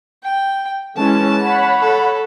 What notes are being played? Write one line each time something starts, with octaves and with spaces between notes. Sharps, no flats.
G5
E3 G#3 C#4 A5
C#5 F#5 B5
A4